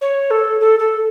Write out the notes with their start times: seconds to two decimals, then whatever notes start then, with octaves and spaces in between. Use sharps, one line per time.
0.01 C#5
0.31 A4
0.60 A4
0.79 A4